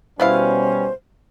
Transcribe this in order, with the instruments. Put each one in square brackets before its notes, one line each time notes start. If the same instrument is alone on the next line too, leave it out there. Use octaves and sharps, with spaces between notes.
[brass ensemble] B2 G3 C#4 [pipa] B3 E4 F5 [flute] C5